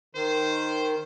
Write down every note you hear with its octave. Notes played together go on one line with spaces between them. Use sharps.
D#3 C5